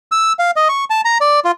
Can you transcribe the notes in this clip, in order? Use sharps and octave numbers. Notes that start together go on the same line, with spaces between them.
E6
F5
D#5
C#6
A5
A#5
D5
F4